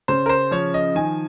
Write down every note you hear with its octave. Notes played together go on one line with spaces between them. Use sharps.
C#3 C5
A#4
C5
F3 C#5
D#5
D#3 G#5